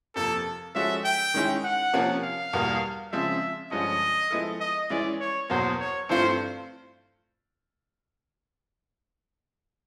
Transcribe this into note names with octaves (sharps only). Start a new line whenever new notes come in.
F2 C3 F3 A#3 A4
F3 G#3 C#4 F#4 A4 E5
G5
D#3 G#3 C#4 E4
F#5
C3 F3 A#3 C#4
F5
E2 B2 G3 A#3
C#3 F3 G#3 C4 E5
G2 D3 F3 G#3 C#4 D#5
F3 G#3 B3 E4 A4
D#5
E3 G#3 C#4 E4 D5
C#5
E2 B2 F#3 A#3 C5
C#5
G2 E3 A3 C4 F4 C5